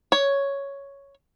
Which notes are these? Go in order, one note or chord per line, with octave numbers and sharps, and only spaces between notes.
C#5